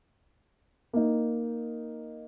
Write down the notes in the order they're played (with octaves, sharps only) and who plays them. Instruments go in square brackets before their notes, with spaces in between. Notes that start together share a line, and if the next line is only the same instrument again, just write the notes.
[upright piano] A#3 D#4